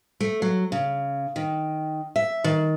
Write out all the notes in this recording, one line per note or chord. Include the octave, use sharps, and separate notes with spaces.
A3
F#3
C#3
D#3
E5
D#3